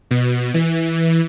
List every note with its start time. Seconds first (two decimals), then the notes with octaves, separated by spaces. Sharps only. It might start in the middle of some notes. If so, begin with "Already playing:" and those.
0.11 B2
0.54 E3